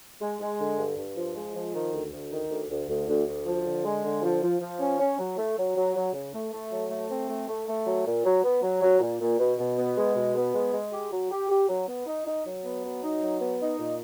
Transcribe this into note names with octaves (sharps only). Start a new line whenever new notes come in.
G#3
G#3
D3
G2
G2
F3
G#3
F3
D#3
D2
D2
D#3
D2
D2
D2
D2
D2
F3
D3
G#3
D3
F3
F3
F3
C#4
C#4
F#3
A3
F#3
F#3
F#3
C#3
A3
A3
F#3
A3
C4
A3
A3
A3
F#3
A#2
F#3
B3
F#3
F#3
A#2
A#2
B2
B2
B3
G#3
B2
B3
G#3
G#3
G4
F#3
G4
G4
F#3
B3
D#4
D#4
F#3
B3
F#3
D#4
F#3
B3
D#4
A#2